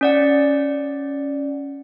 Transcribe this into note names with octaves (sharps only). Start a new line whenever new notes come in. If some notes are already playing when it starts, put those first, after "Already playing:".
C#4 D5 F#5